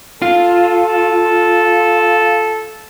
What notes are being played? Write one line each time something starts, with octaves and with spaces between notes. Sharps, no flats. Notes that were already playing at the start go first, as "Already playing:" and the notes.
F4 A4